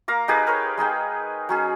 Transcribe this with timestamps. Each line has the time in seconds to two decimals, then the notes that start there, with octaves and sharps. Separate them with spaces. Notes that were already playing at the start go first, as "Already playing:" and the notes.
0.08 A#3 F5 A#5 D6
0.28 D#4 G4 G#4 B4
0.47 A#4 B4 C#5
0.78 G#3 D#4 G#4 G5
1.49 F#3 C#4 G#4